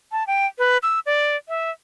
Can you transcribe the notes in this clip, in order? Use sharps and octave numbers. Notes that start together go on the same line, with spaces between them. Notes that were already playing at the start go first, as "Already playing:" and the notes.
A5
G5
B4
E6
D5
E5